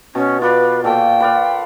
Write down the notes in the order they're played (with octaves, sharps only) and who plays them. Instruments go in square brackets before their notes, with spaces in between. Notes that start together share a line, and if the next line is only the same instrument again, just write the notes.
[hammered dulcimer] B2 [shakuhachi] C#4
[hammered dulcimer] F4 D5 [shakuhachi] B4
[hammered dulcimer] A#2 A4 C#6 [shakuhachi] G5
[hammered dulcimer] B4 D5 F5